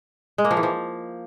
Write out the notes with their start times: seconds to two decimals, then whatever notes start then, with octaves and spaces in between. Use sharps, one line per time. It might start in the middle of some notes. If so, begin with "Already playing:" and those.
0.38 G#3
0.45 A#3
0.51 F3
0.57 E3
0.63 F3